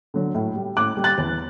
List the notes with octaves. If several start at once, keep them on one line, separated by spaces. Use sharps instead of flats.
D3 F#3
A2
G3
A2 D6 F#6
G3
F#6 A6
E2